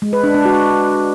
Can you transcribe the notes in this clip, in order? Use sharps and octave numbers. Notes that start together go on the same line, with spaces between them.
G#3
B4
D4
D4
F#4